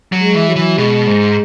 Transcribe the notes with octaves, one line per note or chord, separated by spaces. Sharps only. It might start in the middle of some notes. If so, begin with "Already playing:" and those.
F#3
G#3
E3
F#3
E3
B2 G#3
G#2